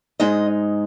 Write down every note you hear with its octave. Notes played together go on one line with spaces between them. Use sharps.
G#2 G#3 D#4 D#5